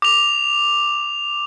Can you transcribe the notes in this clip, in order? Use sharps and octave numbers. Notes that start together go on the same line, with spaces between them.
D6 F7